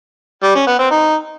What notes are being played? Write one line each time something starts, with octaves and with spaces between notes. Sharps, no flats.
G3
C#4
B3
C4
D#4